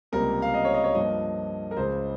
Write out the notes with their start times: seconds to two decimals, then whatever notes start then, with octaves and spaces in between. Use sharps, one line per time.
0.12 C#2 C3 G3 A#3 A#4
0.42 F5
0.54 D#5
0.65 C#5
0.74 D#5
0.84 C#5
0.95 G2 F3 A#3 D#5
1.71 A#4
1.77 C#2 C#3 G#3 C5